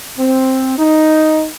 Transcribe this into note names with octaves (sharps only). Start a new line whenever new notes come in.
C4
D#4